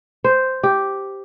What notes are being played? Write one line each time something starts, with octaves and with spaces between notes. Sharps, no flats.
C5
G4